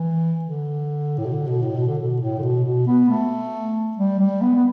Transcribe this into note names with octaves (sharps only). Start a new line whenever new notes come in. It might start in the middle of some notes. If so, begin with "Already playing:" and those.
Already playing: E3
D3
A2
B2
D3
B2
A2
B2
D3
B2
A2
D3
B2
B2
B3
A3
G3
G3
B3
B3